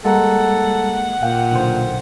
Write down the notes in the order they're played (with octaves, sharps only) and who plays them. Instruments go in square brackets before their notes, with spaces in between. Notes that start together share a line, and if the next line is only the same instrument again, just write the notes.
[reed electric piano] G3 A#5 [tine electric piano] G#3 A#3 [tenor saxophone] A4 [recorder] F#5
[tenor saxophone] A#2 [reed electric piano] F5 G5
[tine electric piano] B1 D3 C5